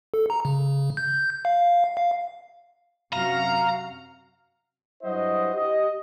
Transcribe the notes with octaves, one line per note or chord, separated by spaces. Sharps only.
A4
A#5
C#3
G6
F5
F5
F#2 C3 F#4 F5 A#5
G2 F#3 E4 F#4 C5 D#5
G4 D#5